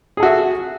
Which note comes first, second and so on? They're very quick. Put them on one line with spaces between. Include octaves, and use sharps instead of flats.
G#4 A4 F#4 E5